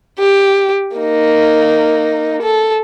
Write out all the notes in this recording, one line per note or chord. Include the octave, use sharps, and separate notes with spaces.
G4
A#3 D#4
A4